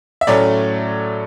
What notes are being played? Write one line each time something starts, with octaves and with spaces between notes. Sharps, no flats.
E5
A2 F#3 A3 C#4 D5